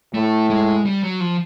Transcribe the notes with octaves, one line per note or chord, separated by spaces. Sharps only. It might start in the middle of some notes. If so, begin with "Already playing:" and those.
A2 A3
G#3
G3
F#3
F3